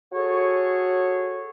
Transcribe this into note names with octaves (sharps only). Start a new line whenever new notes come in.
F#4 G#4 A4 C#5